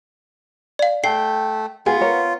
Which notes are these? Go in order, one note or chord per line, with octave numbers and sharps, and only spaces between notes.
D5 F5
A3 G5 C7
B3 F4 G#4
A#4 C#5